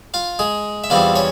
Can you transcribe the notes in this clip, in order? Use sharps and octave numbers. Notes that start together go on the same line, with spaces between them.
F4 F5
G#3 G#4
E5
E2 E3 G3 C4 F4 F5
C#4 C#5